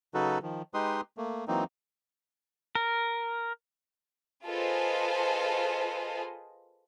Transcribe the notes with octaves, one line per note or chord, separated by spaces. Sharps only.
C#3 F#3 D#4 F#4 A4 B4
D#3 F3
G#3 D#4 G4 B4 C6 D#6
A3 A#3
E3 F#3 A#3 C4 D#4
A#4
F4 G#4 A4 B4 C5 D#5